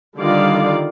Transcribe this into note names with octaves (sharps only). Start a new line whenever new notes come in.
D3 D#3 G3 F4 D5 F5